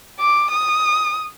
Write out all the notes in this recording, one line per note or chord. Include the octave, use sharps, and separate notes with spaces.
D6
D#6